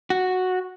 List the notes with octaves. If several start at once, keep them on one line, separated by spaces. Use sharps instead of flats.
F#4